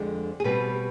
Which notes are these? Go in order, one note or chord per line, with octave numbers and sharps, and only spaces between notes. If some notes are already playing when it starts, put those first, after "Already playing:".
Already playing: F2 D3 G#3 C4
G#4
B2 G3 C4 B4